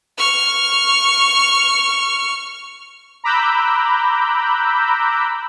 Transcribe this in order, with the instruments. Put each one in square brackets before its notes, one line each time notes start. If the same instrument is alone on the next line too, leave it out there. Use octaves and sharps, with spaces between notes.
[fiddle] C#6 F6
[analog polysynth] A#5 B5 D6 E6 F#6 G6